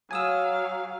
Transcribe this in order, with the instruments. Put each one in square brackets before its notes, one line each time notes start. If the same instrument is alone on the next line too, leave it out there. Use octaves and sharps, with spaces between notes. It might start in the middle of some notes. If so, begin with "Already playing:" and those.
[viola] F#3 F5 [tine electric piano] G#5 D#6 E6